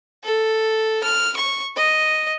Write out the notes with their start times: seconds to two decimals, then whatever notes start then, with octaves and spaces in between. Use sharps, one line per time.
0.24 A4
1.04 F6
1.37 C#6
1.76 D#5